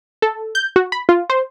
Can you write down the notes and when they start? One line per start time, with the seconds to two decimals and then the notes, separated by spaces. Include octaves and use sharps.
0.22 A4
0.55 G6
0.76 F#4
0.92 B5
1.09 F4
1.30 C5